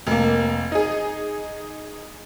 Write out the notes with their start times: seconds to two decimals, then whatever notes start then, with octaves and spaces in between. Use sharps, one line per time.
0.07 F1 A#3
0.72 D#4 G#4